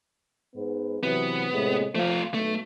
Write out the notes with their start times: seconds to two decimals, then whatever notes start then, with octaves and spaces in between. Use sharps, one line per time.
0.55 G#2 B3
1.03 C3 E3 F#3 B3
1.53 A2 C3 G#3
1.95 F3 A3 F4
2.34 B1 A3